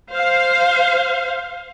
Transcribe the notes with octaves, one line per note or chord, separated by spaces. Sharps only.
C5 F5